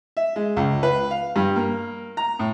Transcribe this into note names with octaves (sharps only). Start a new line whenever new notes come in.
E5
G#3
C#2
B4
F5
G2
A#3
A#5
A2